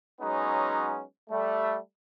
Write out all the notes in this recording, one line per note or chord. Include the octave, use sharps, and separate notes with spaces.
F#3 G#3 B3 C#4 D#4
G3 A3